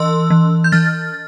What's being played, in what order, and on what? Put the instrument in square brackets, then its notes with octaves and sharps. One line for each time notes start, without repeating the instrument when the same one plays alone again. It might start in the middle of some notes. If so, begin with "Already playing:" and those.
Already playing: [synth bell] E3 C6 E6
E3
G6
E3 F6 A6